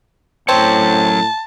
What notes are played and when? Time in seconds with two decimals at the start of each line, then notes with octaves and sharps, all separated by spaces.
0.49 F#2 A2 C4 C#5 A5